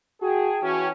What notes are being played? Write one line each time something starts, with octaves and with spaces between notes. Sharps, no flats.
F#4 G#4 G5 A5
E3 C#4 F#4